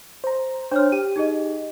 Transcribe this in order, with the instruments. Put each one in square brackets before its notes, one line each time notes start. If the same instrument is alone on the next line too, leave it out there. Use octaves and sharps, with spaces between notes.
[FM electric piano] C5 A#5
[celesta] D4 C#5 F6 [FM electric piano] C5
[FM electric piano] G4 [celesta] D#7
[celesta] D#4 G#4 D#5